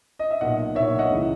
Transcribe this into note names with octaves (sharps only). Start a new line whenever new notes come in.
D#5
E5
B1 A#2 D#5 F#5
B1 A#2 C#5 E5
D#5 F#5
C#2 C#3 E3